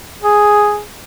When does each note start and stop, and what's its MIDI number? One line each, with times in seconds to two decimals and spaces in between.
0.22 0.82 68